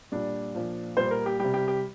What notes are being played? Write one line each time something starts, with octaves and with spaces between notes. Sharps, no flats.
A#2 G3 D4
A#2 F3
A#2 G3 C5
A#4
G4
C3 G3 G4
G4
G4